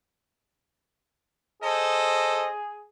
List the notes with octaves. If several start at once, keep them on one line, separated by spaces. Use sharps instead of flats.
G#4 A4 C5 D#5